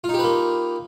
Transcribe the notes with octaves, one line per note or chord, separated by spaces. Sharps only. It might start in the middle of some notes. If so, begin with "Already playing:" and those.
A#3 D#4 F4 G4 B4